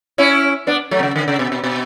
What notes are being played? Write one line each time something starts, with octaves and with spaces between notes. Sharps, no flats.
C#4 E4
B3 D4
F#3 A3
B2
C#3
D3
C#3
B2
B2
B2